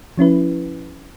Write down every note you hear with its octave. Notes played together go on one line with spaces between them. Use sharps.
F3 C#4 E4 B4